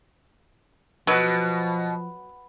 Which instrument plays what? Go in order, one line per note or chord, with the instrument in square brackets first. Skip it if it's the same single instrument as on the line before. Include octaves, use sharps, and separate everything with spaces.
[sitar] B2 [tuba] F3 [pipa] F#3 B4